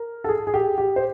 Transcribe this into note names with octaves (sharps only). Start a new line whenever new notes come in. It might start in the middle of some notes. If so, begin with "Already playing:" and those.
Already playing: A#4
A4
G#4
G#4
G4
G4
C5